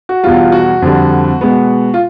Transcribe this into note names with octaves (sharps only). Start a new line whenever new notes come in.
F#4
E2 B2 G3 F4
F#4
F2 D3 G3
B2 G#3 B3
F4